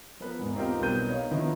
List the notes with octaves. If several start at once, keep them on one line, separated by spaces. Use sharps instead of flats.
F3 B3 A#4 B4
E2 G#2
B3 C4 D#4 F4 G4 A#4
B1 G3 A#4 B4 G6 D#7
D#4 C#5 F5
D3 D#3 F3 B3 E4